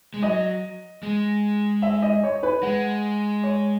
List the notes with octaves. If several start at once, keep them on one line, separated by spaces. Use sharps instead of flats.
G#3
F#3 D#5
G#3
E5
D#5
C#5
B4
G#3 F#5
C#5